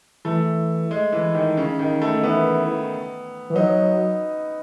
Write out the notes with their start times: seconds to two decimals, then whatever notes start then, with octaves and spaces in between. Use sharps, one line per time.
0.25 E3 A3
0.91 G#3
1.12 E3
1.35 D#3
1.57 C#3
1.79 D#3
2.02 A3
2.13 D#3
2.23 E3 B3
3.50 E3
3.55 F#3 D#4